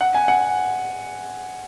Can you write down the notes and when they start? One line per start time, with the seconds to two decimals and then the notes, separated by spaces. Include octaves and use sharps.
0.01 F#5
0.15 G#5
0.28 F#5